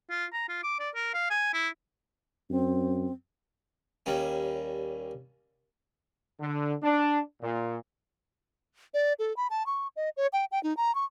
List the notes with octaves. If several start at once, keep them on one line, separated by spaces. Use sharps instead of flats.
F4
A#5
F4
D6
D5
A#4
F5
G#5
E4
F#2 C4
D#2 G3 C#4
D3
D4
A#2
D5
A4
B5
A5
C#6
D#5
C#5
G5
G5
D#4
A#5
C#6